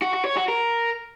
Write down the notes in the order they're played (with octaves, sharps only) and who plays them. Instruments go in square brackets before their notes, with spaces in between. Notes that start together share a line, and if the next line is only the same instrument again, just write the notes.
[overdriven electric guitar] F#4
F#4
C#5
F#4
A#4